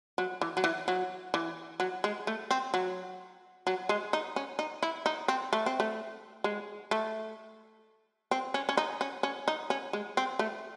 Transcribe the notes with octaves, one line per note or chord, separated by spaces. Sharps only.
F#3
E3
F#3
E3
F#3
E3
F#3
G#3
A3
C4
F#3
F#3
G#3
D#4
C#4
D#4
E4
D#4
C4
A3
C4
A3
G#3
A3
C4
C#4
C#4
D#4
C#4
C#4
D#4
C#4
G#3
C4
A3